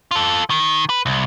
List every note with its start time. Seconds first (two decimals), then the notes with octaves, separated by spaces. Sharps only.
0.11 F4 A4
0.50 D#3
0.89 B4
1.06 C2